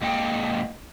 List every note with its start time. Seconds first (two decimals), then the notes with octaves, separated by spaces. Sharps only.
0.02 G#2 A#3 D#5 G5